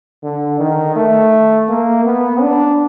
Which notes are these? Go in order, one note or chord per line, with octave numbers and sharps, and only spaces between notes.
D3
D#3
A3
A#3
B3
D4